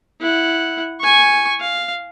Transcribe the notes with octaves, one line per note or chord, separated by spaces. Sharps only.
E4 F#5
G#5 C#6
F5